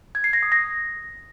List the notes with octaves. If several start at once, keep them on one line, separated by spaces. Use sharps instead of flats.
G#6
C7
A#6
D#6
A#6